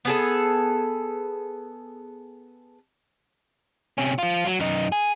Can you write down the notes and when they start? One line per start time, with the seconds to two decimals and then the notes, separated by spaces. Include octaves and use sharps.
0.05 B3 G#4 A4
3.98 C3 C#4
4.18 F3 F4
4.46 F#3
4.60 F#2 D#4
4.92 G#4